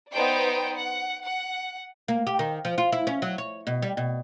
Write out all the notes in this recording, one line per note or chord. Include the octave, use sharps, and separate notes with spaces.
B3 D#4 C5 D5 G5
F#5
F#5
A#3
G4
D#3
F3
F4
E4
C#4
F#3
C#5
B2
G3
B2